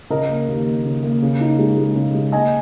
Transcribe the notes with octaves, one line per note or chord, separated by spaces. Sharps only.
C#3 A#4 D#5
A#3
D#2
A#3
C#3
A#3
C#3
D#4
G#3
G#3
C#3
G#3
A#3 D#5 G#5